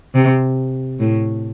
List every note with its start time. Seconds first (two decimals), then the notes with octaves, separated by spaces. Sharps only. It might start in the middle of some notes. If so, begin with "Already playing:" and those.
0.14 C3
0.99 A2